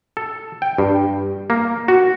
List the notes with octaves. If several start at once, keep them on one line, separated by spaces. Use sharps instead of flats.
A4
G5
G2
A#3
F#4